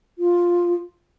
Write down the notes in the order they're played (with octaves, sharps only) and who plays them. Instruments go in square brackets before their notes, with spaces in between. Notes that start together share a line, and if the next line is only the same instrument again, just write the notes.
[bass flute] F4